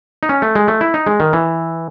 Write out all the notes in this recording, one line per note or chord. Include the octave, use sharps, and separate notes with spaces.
D#4
C#4
A3
G#3
A3
E4
D#4
G#3
D#3
E3